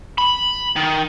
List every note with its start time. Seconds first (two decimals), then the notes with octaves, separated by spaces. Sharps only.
0.18 B5
0.76 D#3